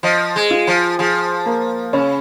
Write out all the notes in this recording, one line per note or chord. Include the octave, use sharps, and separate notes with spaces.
F3 D#5
G#3
F4
F3
F3 G#4
A#3
C#3 C#4